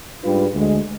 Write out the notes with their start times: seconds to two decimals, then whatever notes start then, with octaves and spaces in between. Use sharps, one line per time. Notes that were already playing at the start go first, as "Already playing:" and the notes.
0.23 G#2 G3 D4 F4 B4
0.53 D2 D3 G#3